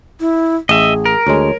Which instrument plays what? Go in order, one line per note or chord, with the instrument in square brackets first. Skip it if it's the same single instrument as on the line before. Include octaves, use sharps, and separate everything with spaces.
[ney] E4
[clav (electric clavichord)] A1 [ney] G#4 [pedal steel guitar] D#5 E5
[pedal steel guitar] A#4
[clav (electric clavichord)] D2 G#3 [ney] C#5